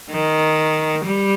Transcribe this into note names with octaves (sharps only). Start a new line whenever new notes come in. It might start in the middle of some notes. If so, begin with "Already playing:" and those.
D#3
G3